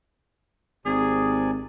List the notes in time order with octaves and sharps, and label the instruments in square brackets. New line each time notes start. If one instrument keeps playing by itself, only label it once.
[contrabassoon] G#1 [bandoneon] C3 D5 G#5 [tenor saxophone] G#4